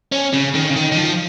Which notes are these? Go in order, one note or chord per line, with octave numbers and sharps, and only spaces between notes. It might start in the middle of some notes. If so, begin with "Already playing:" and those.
C#4
C#3
D#3
C#3
D#3
D#3
F3